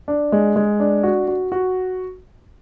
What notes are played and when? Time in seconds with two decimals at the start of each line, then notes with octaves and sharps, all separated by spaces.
0.08 D4
0.32 G#3
0.56 G#3
0.80 D4
1.03 F#4
1.28 F#4
1.52 F#4